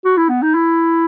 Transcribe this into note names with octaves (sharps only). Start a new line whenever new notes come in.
F#4
E4
B3
D#4
E4